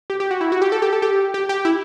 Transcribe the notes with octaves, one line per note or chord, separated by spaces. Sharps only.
G4
G4
F#4
E4
F#4
G4
A4
G4
A4
G4
G4
G4
E4